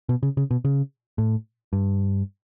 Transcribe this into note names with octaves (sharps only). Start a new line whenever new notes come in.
B2
C#3
C#3
B2
C#3
A2
G2